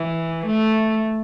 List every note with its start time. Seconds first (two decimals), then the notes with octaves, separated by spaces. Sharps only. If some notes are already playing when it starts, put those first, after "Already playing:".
Already playing: E3
0.46 A3